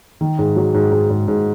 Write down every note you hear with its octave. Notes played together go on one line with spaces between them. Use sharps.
D#3
G#2
F#3
G#2
G#2
G#2
G#2